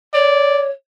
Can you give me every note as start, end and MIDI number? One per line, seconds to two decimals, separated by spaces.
0.14 0.70 73
0.14 0.68 74